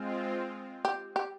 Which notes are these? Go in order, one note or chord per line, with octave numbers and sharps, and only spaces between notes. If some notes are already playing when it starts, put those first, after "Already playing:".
Already playing: G#3 C4 F4
G4
G4